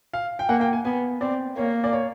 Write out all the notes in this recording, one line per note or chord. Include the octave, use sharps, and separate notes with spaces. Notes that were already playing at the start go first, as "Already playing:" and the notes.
F5
G5
A#3 F#5
G5
G#5
B3 G#5
C4 D5
A#3 C#5
D5
C#5